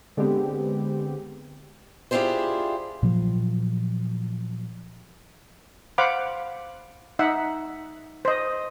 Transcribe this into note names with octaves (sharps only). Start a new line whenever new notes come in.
D3 G#3 B3 C4 G4
D4 E4 F4 G4 G#4 C5
A#2 F3 F#3
C5 F5 F#5 B5 D6
D#4 E5 F#5
C5 D#5